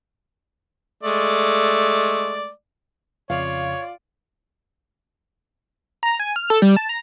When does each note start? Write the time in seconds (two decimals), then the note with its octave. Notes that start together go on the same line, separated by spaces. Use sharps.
1.03 G#3 A3 D5
3.30 F2 C#3 F4 C#5 D5 F5
6.03 A#5
6.20 G#5
6.36 F6
6.50 A4
6.62 G3
6.76 A5
6.89 A#5